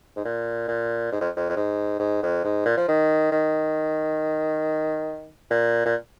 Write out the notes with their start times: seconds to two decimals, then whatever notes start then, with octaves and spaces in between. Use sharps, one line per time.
0.16 G#2
0.25 A#2
0.68 A#2
1.13 G#2
1.21 F2
1.37 F2
1.50 F2
1.56 G#2
2.00 G#2
2.23 F2
2.44 G#2
2.66 A#2
2.77 F3
2.88 D#3
3.32 D#3
5.51 A#2
5.86 A#2